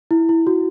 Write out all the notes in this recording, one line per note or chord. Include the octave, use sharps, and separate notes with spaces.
E4
E4
F#4